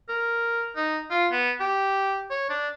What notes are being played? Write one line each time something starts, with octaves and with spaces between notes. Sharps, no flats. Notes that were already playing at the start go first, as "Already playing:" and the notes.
A#4
D#4
F4
B3
G4
C#5
D4